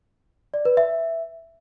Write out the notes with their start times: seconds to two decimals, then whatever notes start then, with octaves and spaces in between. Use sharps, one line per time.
0.54 D5
0.65 B4
0.77 E5